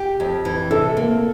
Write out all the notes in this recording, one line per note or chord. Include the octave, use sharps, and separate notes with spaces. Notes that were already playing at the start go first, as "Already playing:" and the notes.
Already playing: G4
F2
E3
C3 A4
A#3